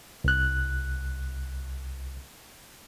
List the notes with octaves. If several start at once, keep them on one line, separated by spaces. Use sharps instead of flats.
C2 F#6